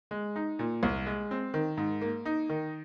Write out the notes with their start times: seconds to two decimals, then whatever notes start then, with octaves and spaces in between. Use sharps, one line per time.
0.11 G#3
0.36 D#4
0.59 A#2
0.83 C2
1.06 G#3
1.31 C4
1.54 D#3
1.77 G#2
2.01 A#3
2.25 D#4
2.49 D#3